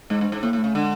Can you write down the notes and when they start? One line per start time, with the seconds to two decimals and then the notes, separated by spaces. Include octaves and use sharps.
0.10 G#2 G#3
0.21 G2
0.32 G#2
0.43 A2 A#3
0.53 A2
0.58 A3
0.64 C#3
0.75 D3 G#3